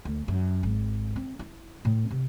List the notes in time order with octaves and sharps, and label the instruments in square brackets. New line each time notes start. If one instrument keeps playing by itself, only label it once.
[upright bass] D2
F#2
G#1
C4
E4
A2
C3